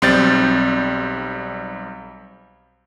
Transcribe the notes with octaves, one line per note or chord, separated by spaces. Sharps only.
B1 G3 C4 G6 A6